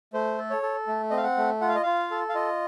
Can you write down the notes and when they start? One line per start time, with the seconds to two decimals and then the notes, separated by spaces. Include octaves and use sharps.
0.13 A3 C5
0.38 A4
0.50 C#5
0.62 A4
0.87 A3
1.10 C4 D#5
1.17 F5
1.24 F#5
1.37 A3
1.61 F4 F#5
1.69 F5
1.75 D#5
1.83 F4 F5
2.11 A4
2.29 F5
2.35 F4 D#5